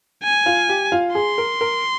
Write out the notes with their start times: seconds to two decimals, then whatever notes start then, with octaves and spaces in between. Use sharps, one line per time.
0.23 G#5
0.46 F4 F5
0.69 G4 G5
0.92 F4 F5
1.15 G#4 C6
1.38 A#4
1.61 A#4